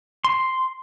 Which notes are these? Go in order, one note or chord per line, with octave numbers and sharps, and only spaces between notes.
C6